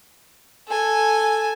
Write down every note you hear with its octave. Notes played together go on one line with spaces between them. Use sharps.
A4 G#5